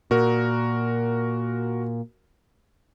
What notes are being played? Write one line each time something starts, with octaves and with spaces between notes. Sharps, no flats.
A#2 F#4 A#4